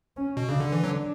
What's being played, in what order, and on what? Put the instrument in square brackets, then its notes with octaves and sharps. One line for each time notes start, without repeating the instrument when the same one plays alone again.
[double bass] C#4
[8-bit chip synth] B2
[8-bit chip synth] C#3 [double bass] D4
[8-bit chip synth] D3
E3
[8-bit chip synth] D3 F#3 [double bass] D4